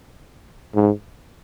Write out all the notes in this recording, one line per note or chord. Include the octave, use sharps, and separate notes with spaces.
G#2